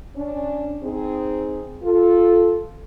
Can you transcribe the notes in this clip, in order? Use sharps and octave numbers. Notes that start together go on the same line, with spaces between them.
C#4 D4
C4 D#4 G#4
F4 A4